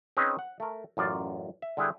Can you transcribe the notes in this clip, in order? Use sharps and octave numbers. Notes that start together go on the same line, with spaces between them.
C4 C#4 D#4 G#4 B4
F#5
A3 A#4
A1 F#2 F4 D5
E5
D3 G3 E4 G#4 F#5 G5